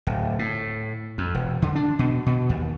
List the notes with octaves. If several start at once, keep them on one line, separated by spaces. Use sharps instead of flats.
D1
A2
F2
E1
D3
D4
B2
B2
D#2